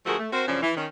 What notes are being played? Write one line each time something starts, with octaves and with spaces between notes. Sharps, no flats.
D3 F3 A3 F#4 G#4 A#4
A3
C4 F#4 A#4 C5
F#2 C#3 F3 C#4 D4
E3
D#3 C#4